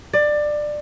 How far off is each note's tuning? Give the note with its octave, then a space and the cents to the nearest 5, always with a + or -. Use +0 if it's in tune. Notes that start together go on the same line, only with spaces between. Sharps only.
D5 +20